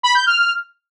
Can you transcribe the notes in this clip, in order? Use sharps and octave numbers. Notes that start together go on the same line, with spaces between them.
B5
G6
F6